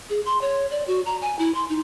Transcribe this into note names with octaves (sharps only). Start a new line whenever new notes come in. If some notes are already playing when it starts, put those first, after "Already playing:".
G#4
C6
C#5
D5
F#4
A#5
G#5
E4
C6
D#4